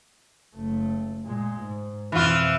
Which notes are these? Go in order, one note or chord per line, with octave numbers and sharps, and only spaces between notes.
F#1 A3
A#2 G#3
G#2
F2 B2 E3 F4